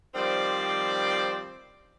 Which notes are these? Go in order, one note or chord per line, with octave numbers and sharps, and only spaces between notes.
D#3 F3 G3 C4 C5 D5